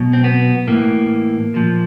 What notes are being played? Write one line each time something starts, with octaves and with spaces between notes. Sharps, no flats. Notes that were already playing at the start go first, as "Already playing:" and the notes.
Already playing: B2 F#3
C4
B3
A2 E3 A#3
A#2 F3